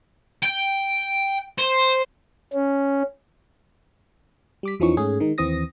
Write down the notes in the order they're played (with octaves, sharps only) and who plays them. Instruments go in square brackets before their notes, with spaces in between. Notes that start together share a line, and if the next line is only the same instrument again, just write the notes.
[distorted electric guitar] G5
C5
[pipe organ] C#4
[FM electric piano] G3 D6 B6
E2 E3 F3 C#4 D#4 C#6
G#2 A3 C#4 G#4
D#3 G#3 D#4
D#2 E3 C4 D#6 A#6